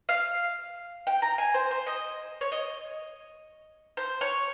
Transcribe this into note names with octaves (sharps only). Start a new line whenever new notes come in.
F5
G5
A#5
G#5
C5
C5
D#5
C#5
D#5
C5
C#5